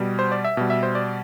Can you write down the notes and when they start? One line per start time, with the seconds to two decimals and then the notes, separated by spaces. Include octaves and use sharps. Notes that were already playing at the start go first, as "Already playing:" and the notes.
Already playing: B2 G3
0.19 C5
0.32 D5
0.44 E5
0.57 B2 G3
0.70 E5
0.83 C5
0.95 D5